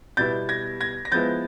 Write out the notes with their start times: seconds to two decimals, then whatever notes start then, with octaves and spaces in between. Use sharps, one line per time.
0.17 B2 G3 B3 E4 G6 A6
0.49 G#6 A#6
0.81 G#6 A#6
1.05 A#6
1.12 F3 G#3 B3 E4 G6 A6